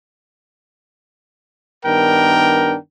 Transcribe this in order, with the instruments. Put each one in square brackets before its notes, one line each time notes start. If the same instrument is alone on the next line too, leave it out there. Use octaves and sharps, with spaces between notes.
[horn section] G2 D#3 B3 D4 A#4 G5